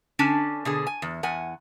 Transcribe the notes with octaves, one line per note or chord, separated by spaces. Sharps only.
D3 C#4 D4 G#5 A5
B2 D3 G#4
G#5
E2
E2 F#5 G#5